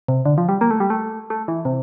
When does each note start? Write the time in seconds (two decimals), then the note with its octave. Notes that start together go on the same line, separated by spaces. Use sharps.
0.08 C3
0.26 D3
0.38 F3
0.49 G3
0.61 A#3
0.71 A3
0.80 G3
0.90 A3
1.30 A3
1.48 E3
1.65 C3